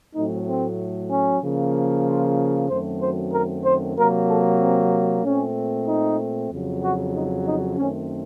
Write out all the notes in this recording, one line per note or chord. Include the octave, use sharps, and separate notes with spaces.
A2 F#3 A3 C4 D#4
C4
C#4
C#3 F3 A#3
F4
F#2 D#3 F#3 A3 C4 C5
C5
A#4
C5
C3 F#3 A#3 A#4
A4
C4
A#2 A3 C4 C#4
D#4
F2 C#3 F#3
F#4
D#4
D#4
F#2 D#3 A3 C4 C#4